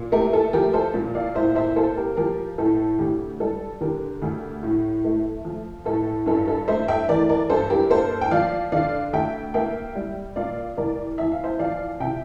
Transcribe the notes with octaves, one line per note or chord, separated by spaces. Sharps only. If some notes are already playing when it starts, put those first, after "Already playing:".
Already playing: A#2
A3 G4 A#4
A4
F3 G4 A#4
A4 C5
A#2
D5 F5
A2 C5 E5
C5 E5
A#3 A4 C5
G4 A#4
F3 G4 A#4
A2 A4
D2 G4
G3 A4
D3 G4 A#4
D2
A2
A3
F3
A2 A4
G2 A4
A4
A3 C5 E5
E5 G5
E3 A#4 D5
A#4 D5
G2 A4 C5
G4 A#4
A#3 A4 C5
G5
F3 D5 F5
D3 D5 F5
D2 E5 G5
A#3 E5 G5
G3
A#2 D5 F5
C2 A#4 D5
E2 E5
F5
C5 E5
F3 D5 F5
C3 E5 G5